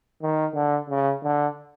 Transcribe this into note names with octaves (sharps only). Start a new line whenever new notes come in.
D#3
D3
C#3
D3